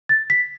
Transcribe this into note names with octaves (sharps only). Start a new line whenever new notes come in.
A6
B6